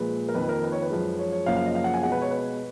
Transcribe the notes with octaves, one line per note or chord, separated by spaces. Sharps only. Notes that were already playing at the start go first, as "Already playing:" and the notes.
Already playing: A#2 F3 G#3 B4
A#4
F2 D#3 A#3 B4
A#4
B4
C#5
B4
F#2 F3 G#3
C#5
C#5
F#2 C#3 F3 A#3 F5
F5
D#5
F5
F#5
G#5
B2 G#3 F#5
B4
C#5
B4